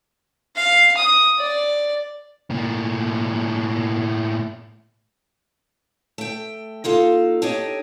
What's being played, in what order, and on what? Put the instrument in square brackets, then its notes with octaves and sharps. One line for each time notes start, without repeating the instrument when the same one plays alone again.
[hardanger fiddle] F5
D#6
D5
[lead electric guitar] A2 A#3
[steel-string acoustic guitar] A3 G5
A#3 D#4 F4 A4
D4 D#4 G4 A4 C#5 D#5